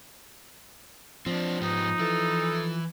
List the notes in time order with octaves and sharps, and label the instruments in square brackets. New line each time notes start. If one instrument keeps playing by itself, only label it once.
[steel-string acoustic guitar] F3 [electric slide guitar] C4 D4
[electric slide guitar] G#2 B3 G4 [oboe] D#4
[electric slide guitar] E3 E4 [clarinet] A4